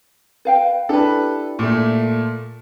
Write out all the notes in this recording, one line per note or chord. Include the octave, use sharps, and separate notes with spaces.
B4 F5 G5
D4 E4 G4 A4 B4
A#2 A3